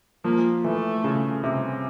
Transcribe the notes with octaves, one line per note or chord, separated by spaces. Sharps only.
F3 A#3
E3 A3
C#3
C3